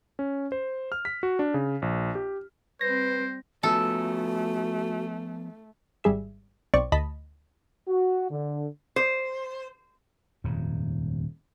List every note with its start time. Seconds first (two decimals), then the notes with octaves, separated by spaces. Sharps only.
0.19 C#4
0.52 C5
0.92 F6
1.05 B6
1.23 F#4
1.39 D4
1.54 C#3
1.82 A#1
2.15 G4
2.81 G3 C4 B4 C5 A#6
3.63 F3 A3 B3 C#4 F#4 A4
6.04 G#1 G3 G#4 E5
6.74 B1 C4 D5 C#6
6.92 D2 D#5 A5 B5 B6
7.88 F#4
8.30 D3
8.96 C5
10.44 D#1 F2 G#2